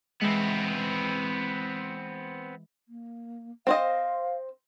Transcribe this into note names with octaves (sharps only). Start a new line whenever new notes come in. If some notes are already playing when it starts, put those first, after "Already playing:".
E3 G#3 B3 C4
A#3
C4 C5 D#5 F5